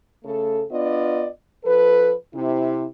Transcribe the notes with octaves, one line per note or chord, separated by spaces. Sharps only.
C#3 A3 A4
B3 D4 F4 D5 D#5
F3 A4 B4
C3 E4